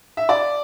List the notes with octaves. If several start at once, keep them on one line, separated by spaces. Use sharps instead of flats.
E5
D5